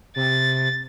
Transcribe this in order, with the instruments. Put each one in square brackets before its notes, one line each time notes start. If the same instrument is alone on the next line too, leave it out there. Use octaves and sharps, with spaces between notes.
[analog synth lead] C3 [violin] A6